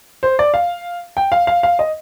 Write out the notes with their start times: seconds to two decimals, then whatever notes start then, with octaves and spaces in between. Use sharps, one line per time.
0.23 C5
0.39 D5
0.54 F5
1.17 G5
1.32 F5
1.47 F5
1.63 F5
1.79 D#5